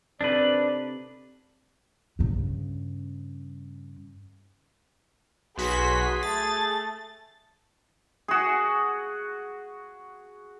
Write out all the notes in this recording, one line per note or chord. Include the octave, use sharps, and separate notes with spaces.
C3 D4 D#4 A4 B4 D5
G2 C#3
B1 F#4 G#4 B4 C6 B6
A3 A6
F#4 G#4